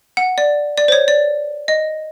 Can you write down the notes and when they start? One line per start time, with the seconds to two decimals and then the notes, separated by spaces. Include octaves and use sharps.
0.17 F#5
0.38 D5
0.77 D5
0.88 C5
0.92 C#5
1.08 D5
1.68 D#5